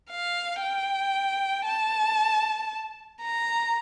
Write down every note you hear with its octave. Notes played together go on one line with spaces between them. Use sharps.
F5
G5
A5
A#5